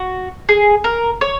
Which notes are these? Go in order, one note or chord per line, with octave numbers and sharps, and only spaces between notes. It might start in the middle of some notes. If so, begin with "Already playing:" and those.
Already playing: F#4
G#4
A#4
C#5